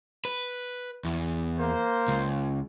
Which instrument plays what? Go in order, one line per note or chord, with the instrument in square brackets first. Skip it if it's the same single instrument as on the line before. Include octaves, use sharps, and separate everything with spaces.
[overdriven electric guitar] B4
E2
[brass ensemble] A#3 C5
[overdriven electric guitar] C#2